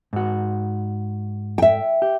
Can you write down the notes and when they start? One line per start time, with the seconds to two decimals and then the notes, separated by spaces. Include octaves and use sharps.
0.13 G#2 F#4
1.58 E5 G5
2.02 G4